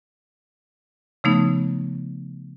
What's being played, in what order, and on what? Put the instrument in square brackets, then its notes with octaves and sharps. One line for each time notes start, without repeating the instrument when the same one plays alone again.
[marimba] C#3 F3 A3 B3 D#4